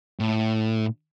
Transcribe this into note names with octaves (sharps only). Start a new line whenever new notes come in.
A2